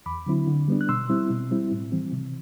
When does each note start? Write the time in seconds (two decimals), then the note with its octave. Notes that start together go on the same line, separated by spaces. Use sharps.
0.06 E2 B5 D6
0.26 D3 F#3 C4 E4
0.47 D3
0.68 G3 B3 D4
0.81 F#6
0.89 B2 C6 E6
1.10 G3 C4 E4
1.30 B2
1.51 G3 C4 E4
1.71 A2
1.92 E3 G3 C4
2.12 C3